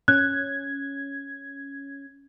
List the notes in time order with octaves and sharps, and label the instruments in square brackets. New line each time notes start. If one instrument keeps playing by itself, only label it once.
[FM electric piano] C#4 G#6 [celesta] F#6